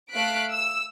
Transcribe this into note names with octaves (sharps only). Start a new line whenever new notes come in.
A3 F5 F#6 B6 D7
E6